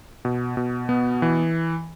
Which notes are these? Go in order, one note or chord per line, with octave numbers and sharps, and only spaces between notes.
B2
B2
B3
E3